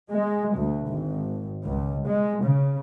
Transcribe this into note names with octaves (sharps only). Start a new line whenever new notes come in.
G#3
D2
G#1
C#2
G#3
C#3